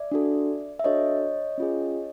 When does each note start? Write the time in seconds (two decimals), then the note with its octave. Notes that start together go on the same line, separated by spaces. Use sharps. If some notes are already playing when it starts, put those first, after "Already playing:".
Already playing: D5 E5
0.12 D4 F#4 A4
0.80 E5
0.84 D4 F#4 A4 C#5 D#5
1.58 C#4 F4 G#4